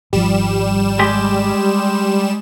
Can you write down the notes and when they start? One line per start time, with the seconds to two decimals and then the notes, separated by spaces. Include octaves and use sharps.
0.13 G#1 F3 G3 E7
0.99 G#3 G4